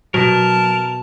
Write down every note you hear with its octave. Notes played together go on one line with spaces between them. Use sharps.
B2 F#3 A#4 A5